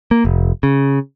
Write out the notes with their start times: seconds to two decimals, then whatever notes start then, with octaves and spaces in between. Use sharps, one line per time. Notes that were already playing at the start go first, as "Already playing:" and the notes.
0.11 A#3
0.25 F1
0.63 C#3